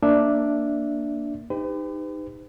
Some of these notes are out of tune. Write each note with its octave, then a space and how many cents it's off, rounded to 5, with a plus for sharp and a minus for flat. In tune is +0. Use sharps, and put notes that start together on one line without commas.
A#3 +0 D4 +0 E5 +0
D#4 -5 G4 +25 B4 +45